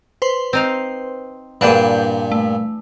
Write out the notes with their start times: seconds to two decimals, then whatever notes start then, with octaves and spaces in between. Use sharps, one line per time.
0.22 B4 C5 C6
0.53 C4 D#4 F5
1.61 G2 A#2 E3 D4 G#4 F#5 G6
2.32 A3